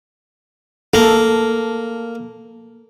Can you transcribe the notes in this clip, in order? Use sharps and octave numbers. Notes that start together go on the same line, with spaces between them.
A#3 A4